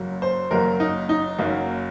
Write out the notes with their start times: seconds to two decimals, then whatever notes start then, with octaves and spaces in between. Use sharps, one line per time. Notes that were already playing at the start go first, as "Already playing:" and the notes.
Already playing: F#1 F#2 F#3 A#3
0.22 C5
0.51 F#1 F#2 F#3 A#3 A#4
0.80 D#4
1.09 D#4
1.38 F#1 F#2 F#3 A#3